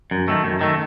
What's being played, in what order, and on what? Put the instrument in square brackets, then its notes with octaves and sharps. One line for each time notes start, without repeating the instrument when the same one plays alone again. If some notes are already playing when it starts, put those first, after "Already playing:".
[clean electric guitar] F#2
D#3 A3
F#2
D#3 A3